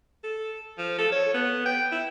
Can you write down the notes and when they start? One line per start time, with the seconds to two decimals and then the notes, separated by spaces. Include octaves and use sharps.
0.24 A4
0.79 F3
0.99 A4
1.12 C#5
1.34 B3
1.66 G5
1.92 E4